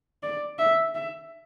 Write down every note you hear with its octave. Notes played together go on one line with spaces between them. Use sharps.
D5
E5
E5